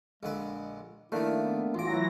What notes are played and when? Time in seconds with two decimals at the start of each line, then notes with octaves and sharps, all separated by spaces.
0.23 A#1 D3 G#3 B4
1.12 D#3 F3 A3 A#3 D4 E4
1.42 B3
1.74 A1 E3 F#3 F4 D6 A#6